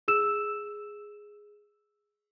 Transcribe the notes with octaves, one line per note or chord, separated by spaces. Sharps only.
G#4 E6 E7